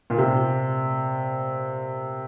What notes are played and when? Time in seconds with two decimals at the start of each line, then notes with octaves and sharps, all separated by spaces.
0.10 A#2
0.18 C3